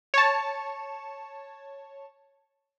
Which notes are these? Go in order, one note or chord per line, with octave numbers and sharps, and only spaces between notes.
C#5 A5